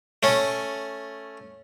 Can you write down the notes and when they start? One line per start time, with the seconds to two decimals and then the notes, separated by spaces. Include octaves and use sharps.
0.23 A3 C#4